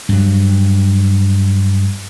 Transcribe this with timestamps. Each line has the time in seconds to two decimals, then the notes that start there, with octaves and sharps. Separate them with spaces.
0.09 G2 F#3